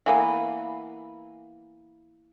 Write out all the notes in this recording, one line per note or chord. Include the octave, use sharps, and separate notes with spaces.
E3 A#3 B3